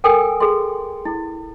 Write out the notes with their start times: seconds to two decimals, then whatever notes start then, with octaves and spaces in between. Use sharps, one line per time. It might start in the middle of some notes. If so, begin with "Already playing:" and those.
0.04 A4 A#4 G5 G#5 D#6
0.40 G#4 A4 C6
1.05 E4